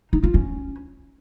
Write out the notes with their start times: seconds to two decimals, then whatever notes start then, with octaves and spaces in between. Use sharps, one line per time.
0.13 D#4
0.23 F4
0.34 C#4